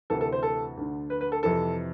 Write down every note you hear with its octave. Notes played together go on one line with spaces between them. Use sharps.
D2 C3 E3 A4
A4
C5
A4
D2 D3
B4
B4
A4
F2 C3 E3 A4